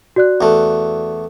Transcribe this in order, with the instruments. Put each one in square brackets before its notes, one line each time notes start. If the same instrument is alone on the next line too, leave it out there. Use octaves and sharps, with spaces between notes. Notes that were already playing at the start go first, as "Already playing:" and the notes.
[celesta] F#4 D5 F#6
[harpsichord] E2 A3